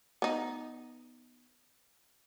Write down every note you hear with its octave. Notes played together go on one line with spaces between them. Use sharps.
B3 D#4